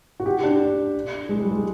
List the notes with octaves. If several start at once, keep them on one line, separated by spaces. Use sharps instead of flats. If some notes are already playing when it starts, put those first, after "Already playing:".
F#4
G4
D4
G#3
G3
G#3